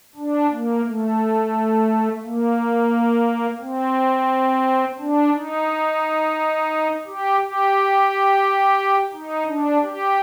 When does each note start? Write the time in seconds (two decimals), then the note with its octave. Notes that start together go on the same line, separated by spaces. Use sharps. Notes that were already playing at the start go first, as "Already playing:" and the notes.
0.16 D4
0.50 A#3
0.84 A3
2.22 A#3
3.60 C4
4.99 D4
5.33 D#4
7.06 G4
7.40 G4
9.12 D#4
9.47 D4
9.81 G4